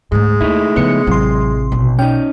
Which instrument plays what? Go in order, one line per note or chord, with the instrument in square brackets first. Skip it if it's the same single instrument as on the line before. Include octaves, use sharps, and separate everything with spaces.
[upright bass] D2 G#2 [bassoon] G#3
[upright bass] D#2 [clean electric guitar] A3 D#4 E4
[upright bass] C#3 F3 [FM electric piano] B3 C#7
[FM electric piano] A1 C6 [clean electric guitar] C3 [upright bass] F#3
[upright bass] B1
[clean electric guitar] C#4 D#4 [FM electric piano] G5